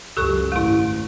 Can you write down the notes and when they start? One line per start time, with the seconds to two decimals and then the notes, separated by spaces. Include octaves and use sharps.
0.17 C#2 F#2 G4 A4 C#6
0.52 G#1 A3 E4